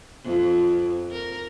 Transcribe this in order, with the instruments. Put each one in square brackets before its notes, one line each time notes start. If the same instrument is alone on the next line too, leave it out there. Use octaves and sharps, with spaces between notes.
[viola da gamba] F2
A#4